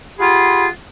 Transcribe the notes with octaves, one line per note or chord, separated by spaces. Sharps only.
F4 G4 G#4 F#5 B5